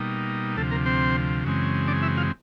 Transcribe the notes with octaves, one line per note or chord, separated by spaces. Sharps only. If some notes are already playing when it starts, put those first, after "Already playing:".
Already playing: B2 G3 A#3 D#4
D2 C3 F3 A3 A4
A#3 A#4
C4 C5
F#2 C#3 E3 G#3 C4
D4 D5
E4 E5
F4 F5